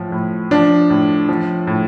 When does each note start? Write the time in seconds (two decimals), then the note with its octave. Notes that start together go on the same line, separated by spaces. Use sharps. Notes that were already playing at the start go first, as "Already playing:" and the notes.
Already playing: A2 F3
0.12 A2
0.51 F3 D4
0.90 A2
1.29 F3
1.67 A2